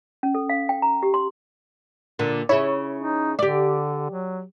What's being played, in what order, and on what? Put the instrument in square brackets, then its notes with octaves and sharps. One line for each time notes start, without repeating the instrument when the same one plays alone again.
[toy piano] C#4
A4
F5
G5
A#5
G4
C6
[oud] A#2 D3
[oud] C#3 E4 [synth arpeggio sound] C#5
[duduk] D#4
[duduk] D3 [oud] G4 D5
[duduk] F#3